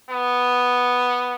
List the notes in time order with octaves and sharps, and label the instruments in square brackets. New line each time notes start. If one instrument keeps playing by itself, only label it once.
[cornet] B3